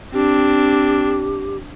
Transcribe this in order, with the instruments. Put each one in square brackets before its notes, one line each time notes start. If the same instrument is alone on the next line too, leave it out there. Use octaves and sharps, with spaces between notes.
[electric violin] C4 D4 [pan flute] G4